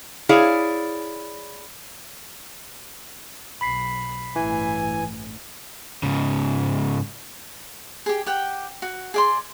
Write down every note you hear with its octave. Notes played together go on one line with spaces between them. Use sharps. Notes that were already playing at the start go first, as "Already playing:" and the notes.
E4 G#4 C#5 D5 F5
B1 B5 B6 C7
A1 G2 E3 G#5
G#2 C#3
G4 G#4
G4 F#5 G5
F#4
G#4 D5 C6